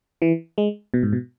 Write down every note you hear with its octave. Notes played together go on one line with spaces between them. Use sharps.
E3
G#3
B2
G#2
B2